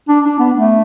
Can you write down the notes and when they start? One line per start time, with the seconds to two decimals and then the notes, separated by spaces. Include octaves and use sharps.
0.08 D4
0.25 D4
0.39 B3
0.55 A3